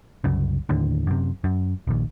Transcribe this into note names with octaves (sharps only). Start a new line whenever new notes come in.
C2 F#2 C#3
D#2 A2 D3
F#2 C3
F#2
D#1 A#1 D#2